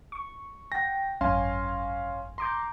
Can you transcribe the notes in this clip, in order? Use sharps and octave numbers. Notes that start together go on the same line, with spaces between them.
C#6
F#5 G5 A#6
G#1 F#2 C#4 F5 G#5 C6
A#5 C6 D6 G6